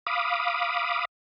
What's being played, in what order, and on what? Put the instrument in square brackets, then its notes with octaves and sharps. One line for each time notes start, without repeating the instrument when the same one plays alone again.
[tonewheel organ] F5 B5 D6 D#6